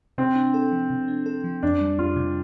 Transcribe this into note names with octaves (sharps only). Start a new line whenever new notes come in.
C3 C4
D4
A4
F3
C3
D4
A4
F3
F2 D4
G3
F2 F4
C3